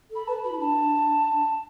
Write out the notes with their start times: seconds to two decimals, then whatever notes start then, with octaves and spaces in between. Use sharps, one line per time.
0.10 A4 B5
0.27 B4 A5
0.44 F#4 B5
0.51 E4
0.59 D4 A5